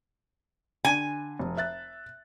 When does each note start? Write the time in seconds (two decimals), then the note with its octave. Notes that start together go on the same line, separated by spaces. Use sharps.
0.85 D3 G#5
1.39 F1
1.57 E5 F#6 A6